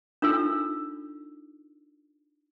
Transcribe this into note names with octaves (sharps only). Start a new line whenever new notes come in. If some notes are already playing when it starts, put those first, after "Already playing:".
D4 D#4 F4 A4 E6